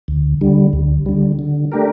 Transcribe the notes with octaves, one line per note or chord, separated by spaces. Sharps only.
D2
D3 G3
D2
D3 G3
D3
A3 D4 G4 A#4